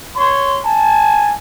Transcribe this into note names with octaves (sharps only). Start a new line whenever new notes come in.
C#5 C6
G#5 A5